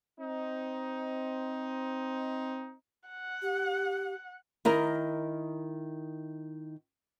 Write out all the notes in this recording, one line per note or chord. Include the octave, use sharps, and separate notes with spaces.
C4 D#4
F#5
G4
D#3 E4 A#4 D#5